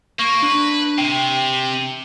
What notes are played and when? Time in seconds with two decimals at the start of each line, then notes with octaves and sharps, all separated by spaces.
0.19 A#3 C#6
0.42 D4 B4
0.98 C3 G5